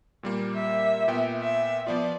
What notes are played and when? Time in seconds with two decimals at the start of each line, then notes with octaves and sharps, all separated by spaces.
0.23 A#2 G3 A#3
0.54 E5
1.08 A#2 B3 G5
1.42 E5
1.87 F3 B3 F4 D5